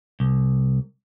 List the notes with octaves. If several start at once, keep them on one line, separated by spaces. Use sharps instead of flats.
C2